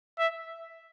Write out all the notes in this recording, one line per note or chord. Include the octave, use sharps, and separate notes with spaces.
E5